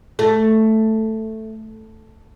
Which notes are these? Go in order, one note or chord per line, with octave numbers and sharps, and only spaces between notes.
A3